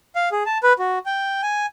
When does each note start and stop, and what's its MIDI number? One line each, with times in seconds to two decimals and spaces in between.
0.15 0.29 77
0.32 0.43 68
0.46 0.58 81
0.63 0.73 71
0.79 0.99 66
1.06 1.42 79
1.42 1.66 80